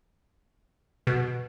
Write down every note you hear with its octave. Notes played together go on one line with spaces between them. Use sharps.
B2